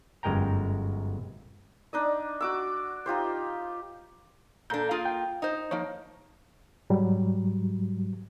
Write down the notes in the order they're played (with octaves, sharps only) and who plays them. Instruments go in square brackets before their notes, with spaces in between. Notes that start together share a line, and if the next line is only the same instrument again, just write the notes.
[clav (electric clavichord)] G1 F#2 G#3 A#4 G5 A#5
[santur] D4 D#4 D#5
F#4 D6 E6
D#4 F4 G4 C5
[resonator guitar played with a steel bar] A#2 D4 [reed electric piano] A4 A#5 G6
[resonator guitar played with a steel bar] A#3 F4 G#4
[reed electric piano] G5
[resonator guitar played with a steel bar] D#4 C5 [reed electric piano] D#5
[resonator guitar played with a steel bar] F3 A#3 [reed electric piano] D#4 C#5
[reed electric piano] G#2 F#3 G3